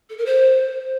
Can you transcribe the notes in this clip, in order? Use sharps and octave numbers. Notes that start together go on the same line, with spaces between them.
A4
A#4
C5